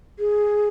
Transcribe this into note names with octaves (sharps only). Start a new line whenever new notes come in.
G#4